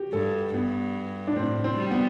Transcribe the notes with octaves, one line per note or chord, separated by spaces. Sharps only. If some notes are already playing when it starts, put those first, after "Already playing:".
Already playing: F#4 G4
G2 A4
G2 B3
D4
A2 C4
C4
G3
B3